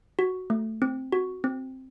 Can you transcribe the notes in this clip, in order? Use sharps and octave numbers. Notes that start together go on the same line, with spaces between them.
F#4
A3
C4
F#4
C4